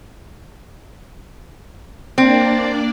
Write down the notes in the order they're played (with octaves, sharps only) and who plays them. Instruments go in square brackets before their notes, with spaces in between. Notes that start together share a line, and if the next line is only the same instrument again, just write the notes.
[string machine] A#3 D4 D5 [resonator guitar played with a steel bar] C4